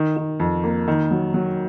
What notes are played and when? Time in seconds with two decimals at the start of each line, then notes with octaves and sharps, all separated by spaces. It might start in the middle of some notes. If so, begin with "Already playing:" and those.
Already playing: D#3
0.16 D#3
0.40 F2
0.64 A#3
0.88 D#3
1.11 F#3
1.34 F#3